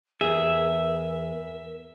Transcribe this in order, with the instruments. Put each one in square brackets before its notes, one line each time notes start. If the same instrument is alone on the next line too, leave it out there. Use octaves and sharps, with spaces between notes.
[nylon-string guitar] E2 [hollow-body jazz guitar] G#4 [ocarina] A#4 [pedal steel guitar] E5